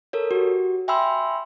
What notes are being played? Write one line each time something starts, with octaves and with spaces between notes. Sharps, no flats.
A4 A#4 C#5
F#4 G4
E5 G5 G#5 B5 C6 E6